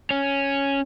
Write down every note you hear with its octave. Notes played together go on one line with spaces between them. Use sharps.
C#4